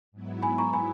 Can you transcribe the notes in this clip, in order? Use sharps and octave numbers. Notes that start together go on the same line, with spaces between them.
G#2 F#3 B3 E4
G#5 B5
A#5 C#6
G#5 B5